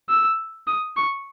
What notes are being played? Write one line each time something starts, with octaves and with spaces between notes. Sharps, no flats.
E6
D#6
C#6